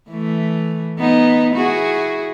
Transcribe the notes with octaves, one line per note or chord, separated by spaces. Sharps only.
E3 A3
B3 D#4
E4 F#4 G#4